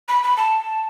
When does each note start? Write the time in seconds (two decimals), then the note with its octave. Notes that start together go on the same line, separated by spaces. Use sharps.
0.08 B5
0.23 B5
0.37 A5